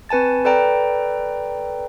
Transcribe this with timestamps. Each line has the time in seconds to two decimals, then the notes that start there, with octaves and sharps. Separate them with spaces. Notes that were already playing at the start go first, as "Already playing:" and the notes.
0.09 C4 B4 G#5 A5 A6
0.45 A4 B4 D5 G5 A#5